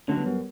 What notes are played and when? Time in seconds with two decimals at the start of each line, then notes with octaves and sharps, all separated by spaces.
0.08 D3 F#3 A3 C#4
0.17 G3 B3
0.26 F#2